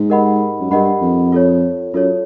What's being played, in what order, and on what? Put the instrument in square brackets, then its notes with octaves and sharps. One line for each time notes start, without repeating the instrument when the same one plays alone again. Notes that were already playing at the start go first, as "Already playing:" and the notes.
Already playing: [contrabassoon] G#2
[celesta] G4 A#4 D#5 F#5 B5
[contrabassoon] F#2
[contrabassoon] G2 [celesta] G4 A#4 D#5 F#5 B5
[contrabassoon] F2
[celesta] F4 A4 C#5
[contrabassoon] F#2 [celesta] F4 A4 C#5